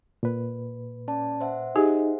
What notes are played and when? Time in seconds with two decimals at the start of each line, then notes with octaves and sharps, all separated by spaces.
0.23 A#2 B4
1.08 C#4 D5 A5
1.41 C5 E5 F#5
1.76 D#4 G4 G#4